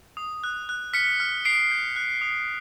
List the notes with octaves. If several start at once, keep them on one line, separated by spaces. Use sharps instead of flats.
D#6
F#6
F#6
F6 B6 C#7
F6
D#6 C7 D7
G6
F#6
D#6